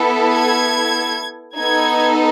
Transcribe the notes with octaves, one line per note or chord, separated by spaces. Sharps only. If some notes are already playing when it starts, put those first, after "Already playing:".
Already playing: B3 E4 A4
G#6
B3 D#4 A4 G#6